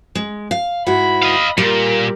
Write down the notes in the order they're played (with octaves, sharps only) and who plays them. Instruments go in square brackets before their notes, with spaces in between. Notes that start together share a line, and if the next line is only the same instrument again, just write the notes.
[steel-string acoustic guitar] G#3
F5
[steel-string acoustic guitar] G#2 E4 F#4 [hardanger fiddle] B5
[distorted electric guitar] D#5 F5
[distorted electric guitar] A#2 [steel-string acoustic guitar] G3 [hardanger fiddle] A#4